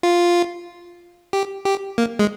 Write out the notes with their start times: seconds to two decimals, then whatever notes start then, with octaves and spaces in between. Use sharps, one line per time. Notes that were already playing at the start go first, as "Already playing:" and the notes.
0.03 F4
1.33 G4
1.65 G4
1.98 A#3
2.19 G#3